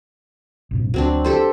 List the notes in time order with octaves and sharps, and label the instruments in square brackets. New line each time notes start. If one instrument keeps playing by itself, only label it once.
[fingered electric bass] A#1 G2 C3
[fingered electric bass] D2 [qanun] F#3 C4 D4
[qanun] G4 A4 C5